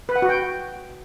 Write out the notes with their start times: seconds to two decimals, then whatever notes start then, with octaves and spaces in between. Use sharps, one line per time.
0.09 B4
0.16 F#5
0.22 F#4
0.29 G5